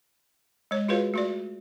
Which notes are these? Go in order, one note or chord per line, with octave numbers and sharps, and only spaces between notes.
G#3 C#5
F4 F#4 G#4 B4 C#5 F5
A3 F#4 D5